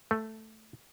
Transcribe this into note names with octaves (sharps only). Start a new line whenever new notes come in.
A3